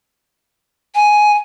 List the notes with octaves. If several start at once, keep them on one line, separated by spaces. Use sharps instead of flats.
G#5